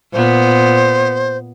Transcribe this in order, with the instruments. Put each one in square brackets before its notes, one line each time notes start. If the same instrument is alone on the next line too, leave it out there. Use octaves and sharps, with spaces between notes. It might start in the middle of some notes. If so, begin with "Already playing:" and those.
[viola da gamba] A#2 B3 [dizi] C5